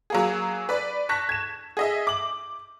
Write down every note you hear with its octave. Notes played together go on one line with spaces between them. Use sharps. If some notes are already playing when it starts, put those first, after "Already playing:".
F#3 A#3 G#4
B4 D5
A5 C#6 F#6 A#6 B6
G#6 E7
G#4 D#5 E5
D6 F#7